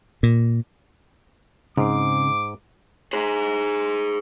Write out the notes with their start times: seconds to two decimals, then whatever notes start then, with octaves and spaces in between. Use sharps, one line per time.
0.23 A#2
1.78 G#2 C#3 C4 D6
3.13 G#4 C5